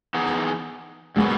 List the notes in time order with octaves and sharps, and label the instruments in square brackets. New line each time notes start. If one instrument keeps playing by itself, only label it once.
[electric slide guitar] E3 B3 D#4 G#4
[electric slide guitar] A#2 F#3 B3 [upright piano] G#3